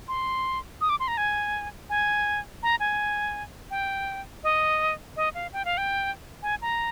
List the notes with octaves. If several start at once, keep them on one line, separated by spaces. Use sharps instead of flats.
C6
D#6
D6
C6
A#5
G#5
G#5
A#5
G#5
G5
D#5
D#5
F5
G5
F5
G5
G#5
A#5